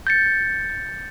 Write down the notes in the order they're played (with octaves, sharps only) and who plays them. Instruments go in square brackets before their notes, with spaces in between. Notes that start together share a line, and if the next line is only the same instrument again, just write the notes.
[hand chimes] G6 A6 C#7